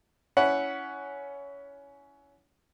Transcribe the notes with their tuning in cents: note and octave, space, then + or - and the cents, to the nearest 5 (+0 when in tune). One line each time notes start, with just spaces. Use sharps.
C#4 +20 E4 +0 F#5 +0